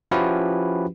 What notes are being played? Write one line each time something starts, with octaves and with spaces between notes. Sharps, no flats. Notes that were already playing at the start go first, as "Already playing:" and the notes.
F3 C#4 E4 F#4 G4 B4